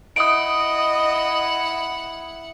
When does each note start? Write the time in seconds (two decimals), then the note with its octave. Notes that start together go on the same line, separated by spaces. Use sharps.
0.16 E4 D#5 F#5 D#6 D7